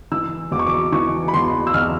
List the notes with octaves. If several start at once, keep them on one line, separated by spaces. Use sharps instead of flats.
E3 E6
E2 D6
C#6
D6
E3 C#6
B5
E2 C6
E6
E2 F6